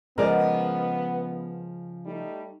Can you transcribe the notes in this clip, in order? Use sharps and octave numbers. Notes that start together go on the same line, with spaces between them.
C#3 F3 G#3 B3 A#4 D5 D#5
G3 A3 D#4